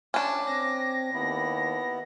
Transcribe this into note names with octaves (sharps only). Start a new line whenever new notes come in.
C#4 D4 D6
C4 A#6
D#2 B3 E4